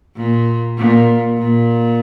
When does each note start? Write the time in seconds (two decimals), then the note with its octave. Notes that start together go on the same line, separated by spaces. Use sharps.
0.16 A#2
0.78 A#2
1.38 A#2